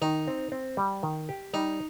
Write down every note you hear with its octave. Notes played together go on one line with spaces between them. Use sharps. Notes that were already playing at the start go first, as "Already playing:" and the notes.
D#3 D#4
C4
C4
G3
D#3
G4
G3 D#4